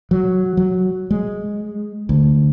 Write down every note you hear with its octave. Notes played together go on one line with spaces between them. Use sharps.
F#3
F#3
G#3
D2